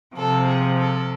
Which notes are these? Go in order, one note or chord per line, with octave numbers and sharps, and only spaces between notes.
C3 F3 A4
G#4
A4